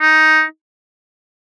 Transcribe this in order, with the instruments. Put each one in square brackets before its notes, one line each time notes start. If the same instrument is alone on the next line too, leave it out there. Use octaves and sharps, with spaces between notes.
[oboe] D#4